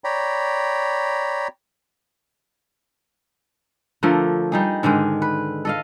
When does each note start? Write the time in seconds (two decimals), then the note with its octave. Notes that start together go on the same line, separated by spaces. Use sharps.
0.04 C#5 D5 G5 A#5 B5
4.03 D3 F3 A3 A#4
4.52 G3 D#4 G#4
4.83 G#2 D3 D#3 G#3
5.22 B4
5.65 A4 D#5 F5